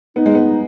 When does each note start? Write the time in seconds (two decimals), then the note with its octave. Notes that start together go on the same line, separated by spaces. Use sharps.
0.16 B3 D#4
0.26 G#3
0.35 B3